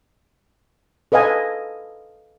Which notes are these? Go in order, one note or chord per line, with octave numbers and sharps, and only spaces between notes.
A4 B4 D#5 F5 G#5